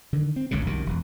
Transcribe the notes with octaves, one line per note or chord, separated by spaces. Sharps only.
D3 D#3
C4
G1 C#2 F#2 C#3
C2 F#2 C3 D#3
E1